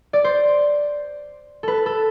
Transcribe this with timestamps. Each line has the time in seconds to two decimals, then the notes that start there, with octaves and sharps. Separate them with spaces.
0.13 D5
0.24 C5
1.63 A4 B4
1.86 A4